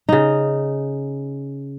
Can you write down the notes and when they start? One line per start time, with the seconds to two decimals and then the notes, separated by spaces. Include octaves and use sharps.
0.09 C#3 D#4